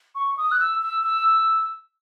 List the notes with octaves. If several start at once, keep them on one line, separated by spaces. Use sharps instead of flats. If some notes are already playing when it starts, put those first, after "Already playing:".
C#6
D#6
F#6
E6
E6
E6